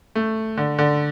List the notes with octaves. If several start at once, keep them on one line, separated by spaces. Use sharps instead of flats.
A3
D3
D3